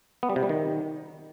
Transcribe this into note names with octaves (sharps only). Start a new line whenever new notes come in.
B3
G3
C3
G3
D#3